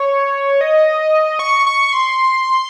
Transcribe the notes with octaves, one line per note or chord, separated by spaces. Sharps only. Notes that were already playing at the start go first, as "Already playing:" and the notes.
Already playing: C#5
D#5
C#6
C#6
C6